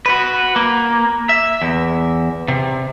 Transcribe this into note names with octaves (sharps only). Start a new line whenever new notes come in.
F#4 B4
A#3
E5
E2
C3